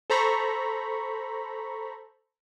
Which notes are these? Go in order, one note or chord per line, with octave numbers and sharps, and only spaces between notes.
A4 C5 A#5 B5 C#6